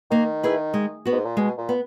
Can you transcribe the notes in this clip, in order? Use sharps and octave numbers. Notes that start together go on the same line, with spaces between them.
D#3 A#3
E4 G#4 B4
G#3
B3 F#4
G#2
A#2
B2 G#3
A#2
B3